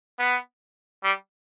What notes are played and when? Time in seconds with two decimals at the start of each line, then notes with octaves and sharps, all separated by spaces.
0.19 B3
1.04 G3